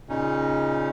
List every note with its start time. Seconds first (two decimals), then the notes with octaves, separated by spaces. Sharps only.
0.09 A#2 C#3 C#4 D#4